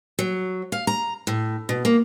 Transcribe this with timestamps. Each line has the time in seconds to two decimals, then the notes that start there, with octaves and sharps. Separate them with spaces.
0.19 F#3
0.72 F5
0.87 A#5
1.27 A2
1.69 B2
1.85 A#3